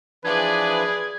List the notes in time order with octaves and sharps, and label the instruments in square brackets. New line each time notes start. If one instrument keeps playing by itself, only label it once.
[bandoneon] E3 F3 D4 [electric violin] G#4 D5 [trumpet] B4 [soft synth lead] G#6